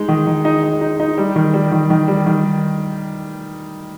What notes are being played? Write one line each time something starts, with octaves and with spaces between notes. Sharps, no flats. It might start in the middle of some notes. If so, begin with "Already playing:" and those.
Already playing: G#3 D#4
D#3
D#3
D#4
D#4
D#4
D#4
G3
D#3
G3
D#3
D#3
G3
D#3